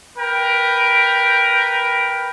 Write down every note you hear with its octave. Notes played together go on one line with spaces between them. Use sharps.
A#4 B4 G5